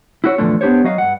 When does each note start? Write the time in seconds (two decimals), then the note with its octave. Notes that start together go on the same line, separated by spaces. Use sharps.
0.24 E4 F#4 C#5
0.38 E2 A2 D3 F3 A3 D4
0.61 B3 D4 E4 G4 C5 C#5
0.84 F#3 F#4 D#5 F5
0.98 G2 F#5